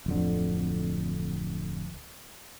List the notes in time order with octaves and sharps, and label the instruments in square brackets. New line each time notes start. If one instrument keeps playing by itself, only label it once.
[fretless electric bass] D1 F2 D3